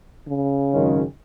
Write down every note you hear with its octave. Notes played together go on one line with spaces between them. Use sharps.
C#3
G#1 F#2 D#3 G#3 C#4